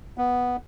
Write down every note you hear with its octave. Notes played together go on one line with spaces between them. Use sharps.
B3